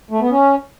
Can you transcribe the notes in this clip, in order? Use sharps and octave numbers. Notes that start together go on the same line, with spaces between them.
A3
B3
C#4